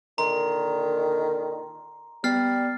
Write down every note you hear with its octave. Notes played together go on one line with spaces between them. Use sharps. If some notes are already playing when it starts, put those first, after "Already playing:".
A#2 D3 D#3 A#5 C6
G3 B3 F6 A6 C7